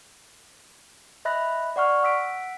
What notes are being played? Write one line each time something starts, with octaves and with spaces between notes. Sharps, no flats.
D#5 E5 B5 F#6 A#6
D5 F#5 C#6 F6
F#5 E6 B6 D7